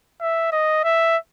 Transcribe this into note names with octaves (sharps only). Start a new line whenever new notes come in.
E5
D#5
E5